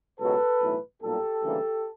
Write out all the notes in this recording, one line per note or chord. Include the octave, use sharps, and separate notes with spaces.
C#2 B2 F#3 A4 B4
B1 A2 E3
B1 A#2 G3 A#3 G4 A4
D2 C#3 E3 G3 A#3